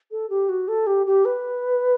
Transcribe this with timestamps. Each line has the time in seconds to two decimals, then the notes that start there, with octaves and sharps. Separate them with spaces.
0.11 A4
0.30 G4
0.49 F#4
0.68 A4
0.87 G4
1.07 G4
1.25 B4